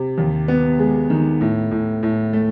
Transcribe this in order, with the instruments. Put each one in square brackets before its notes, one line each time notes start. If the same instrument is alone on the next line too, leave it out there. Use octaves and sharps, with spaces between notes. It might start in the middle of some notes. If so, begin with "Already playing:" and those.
Already playing: [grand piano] C3
D#2
B3
G#3
D#3
A2
A2
A2
A3